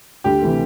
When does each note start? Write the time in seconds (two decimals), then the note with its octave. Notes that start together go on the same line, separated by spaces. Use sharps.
0.24 D2 G4
0.42 C3 E3 A3